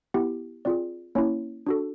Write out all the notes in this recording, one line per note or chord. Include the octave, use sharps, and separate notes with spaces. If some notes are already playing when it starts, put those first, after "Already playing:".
B3 E4 G4
C4 F4 G#4 D5
A#3 C#4 E4 C#5
D4 F#4 A4